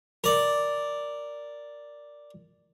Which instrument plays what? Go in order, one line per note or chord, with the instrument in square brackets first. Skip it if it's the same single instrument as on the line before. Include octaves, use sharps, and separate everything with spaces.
[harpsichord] A#4 D5